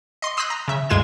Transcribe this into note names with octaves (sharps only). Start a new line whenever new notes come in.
D#5 C6
C6 D#6 E6 F#6 G6 A#6
A#5
C#3 E5
D2 G2 G#3 F4 G#6 E7